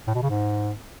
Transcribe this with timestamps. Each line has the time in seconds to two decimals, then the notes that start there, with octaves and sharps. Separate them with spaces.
0.07 A2
0.15 B2
0.22 C#3
0.30 G#2